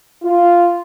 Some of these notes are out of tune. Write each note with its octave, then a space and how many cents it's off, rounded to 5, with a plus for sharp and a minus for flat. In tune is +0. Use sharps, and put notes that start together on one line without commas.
F4 -5